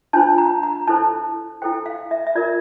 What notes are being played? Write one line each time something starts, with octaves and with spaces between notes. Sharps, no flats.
D4 F4 C5 A5
A#5
A#5
E4 A4 C5 A5
E4 A4 C5 G5
F5
E5
E5
F4 A#4 D5